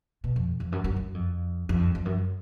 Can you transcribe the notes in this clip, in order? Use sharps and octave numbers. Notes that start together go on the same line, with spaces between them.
B2
F2
F2
F#2
F#2
F#2
F2
F2
F2
F#2